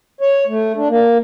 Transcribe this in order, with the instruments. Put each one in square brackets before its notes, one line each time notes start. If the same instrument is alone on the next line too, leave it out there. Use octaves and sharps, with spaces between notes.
[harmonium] C#5
A3
D4
A#3